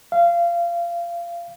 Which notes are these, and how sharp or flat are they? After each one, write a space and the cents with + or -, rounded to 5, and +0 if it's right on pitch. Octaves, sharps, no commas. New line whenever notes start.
F5 -25